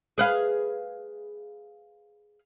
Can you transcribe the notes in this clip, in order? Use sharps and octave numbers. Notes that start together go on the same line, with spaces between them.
G#4 B4 F5